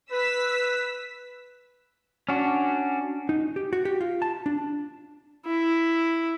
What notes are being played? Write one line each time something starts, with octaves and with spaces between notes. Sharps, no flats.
B4 E6 B6
C#4 D4 F#4
D#4
G4
F#4
G4
F4
A5
D4
E4